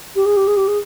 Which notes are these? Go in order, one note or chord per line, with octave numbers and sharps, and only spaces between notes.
G4
G#4
G4
G#4
G4
G#4